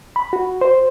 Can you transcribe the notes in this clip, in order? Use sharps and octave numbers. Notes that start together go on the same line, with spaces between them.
B5
F#4
C5